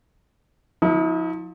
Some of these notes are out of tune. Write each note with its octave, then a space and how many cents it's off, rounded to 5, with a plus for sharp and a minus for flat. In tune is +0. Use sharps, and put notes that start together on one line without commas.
F3 +30 E4 -40